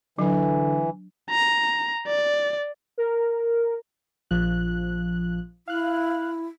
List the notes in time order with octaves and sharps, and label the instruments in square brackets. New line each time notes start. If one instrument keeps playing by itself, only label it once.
[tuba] D3 [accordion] E3 [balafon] F#3 D4
[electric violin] A#5
D5
[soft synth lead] A#4
[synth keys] A#1 F3 F#6
[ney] E4 [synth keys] F5 F#6